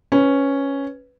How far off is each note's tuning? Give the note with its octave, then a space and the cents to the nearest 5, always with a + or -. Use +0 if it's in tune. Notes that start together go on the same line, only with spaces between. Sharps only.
C#4 +0 B4 +5